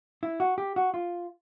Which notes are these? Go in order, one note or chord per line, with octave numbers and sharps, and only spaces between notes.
E4
F#4
G4
F#4
F4